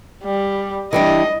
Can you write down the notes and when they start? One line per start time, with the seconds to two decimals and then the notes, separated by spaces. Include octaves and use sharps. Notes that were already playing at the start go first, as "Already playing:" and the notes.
0.23 G3
0.93 E3 G3 D4 D#5